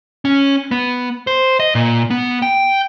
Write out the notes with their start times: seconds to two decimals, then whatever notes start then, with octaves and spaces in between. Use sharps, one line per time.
0.25 C#4
0.71 B3
1.27 C5
1.60 D#5
1.75 A#2
2.10 B3
2.42 G5